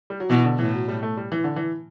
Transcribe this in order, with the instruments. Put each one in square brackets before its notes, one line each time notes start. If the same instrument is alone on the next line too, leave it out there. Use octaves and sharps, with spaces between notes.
[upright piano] G3
F#3
[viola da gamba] B2 [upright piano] E3
[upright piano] D3
[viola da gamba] A2 [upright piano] E3
[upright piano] F#3
G3
A3
G3
E3
D3
E3